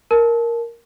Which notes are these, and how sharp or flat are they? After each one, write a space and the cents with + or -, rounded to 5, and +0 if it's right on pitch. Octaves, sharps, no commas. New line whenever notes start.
A#4 +0 A5 -25